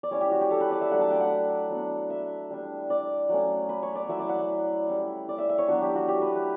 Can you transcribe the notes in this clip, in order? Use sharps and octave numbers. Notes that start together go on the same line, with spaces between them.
D5
G3 C#4 E4 C#5
G4
F#4
G4
A4
B4
D5
E5
F#3 A3 D4 F#5
A5
G5
F#5
F#3 B3 D4
E5
G3 D4
D5
F#3 A3 C#4
B4
C#5
D5
F#3 C#4 E4 E5
D5
F#5
E5
G3 C#4 E4
D5
E5
E5
C#5
F#3 B3 D4 F#4
G4
F#4
G4
B4
B4